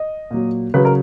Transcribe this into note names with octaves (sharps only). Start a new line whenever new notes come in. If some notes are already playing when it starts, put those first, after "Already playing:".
Already playing: D#5
A#2 F#3
C#3 F#3 B4
A#4